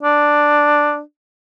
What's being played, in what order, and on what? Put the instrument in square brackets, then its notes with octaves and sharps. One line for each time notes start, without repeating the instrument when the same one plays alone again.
[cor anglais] D4